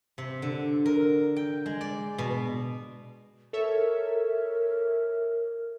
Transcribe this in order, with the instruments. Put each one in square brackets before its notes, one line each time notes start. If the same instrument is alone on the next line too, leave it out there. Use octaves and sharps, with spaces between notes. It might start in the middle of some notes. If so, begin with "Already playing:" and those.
[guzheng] C3
D3
A#4
G5
G#3
D5
B2
[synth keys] A4 C#5 E5 [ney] A#4